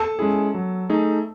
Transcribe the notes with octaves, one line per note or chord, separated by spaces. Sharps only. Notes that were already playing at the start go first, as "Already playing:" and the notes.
Already playing: A4 A5
G#3 C#4 E4 G#4
F#3
A3 D#4 G#4